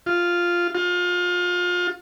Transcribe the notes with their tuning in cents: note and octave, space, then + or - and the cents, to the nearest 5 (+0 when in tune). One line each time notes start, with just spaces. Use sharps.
F4 +0
F4 +30